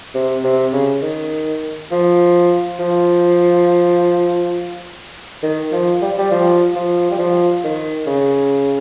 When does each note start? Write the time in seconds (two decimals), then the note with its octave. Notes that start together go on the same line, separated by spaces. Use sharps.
0.14 C3
0.44 C3
0.73 C#3
1.02 D#3
1.91 F3
2.79 F3
5.43 D#3
5.72 F3
6.02 G3
6.19 G3
6.31 F3
6.75 F3
7.11 G3
7.19 F3
7.64 D#3
8.06 C#3